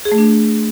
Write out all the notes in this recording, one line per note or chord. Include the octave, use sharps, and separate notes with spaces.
G#4
A3
D4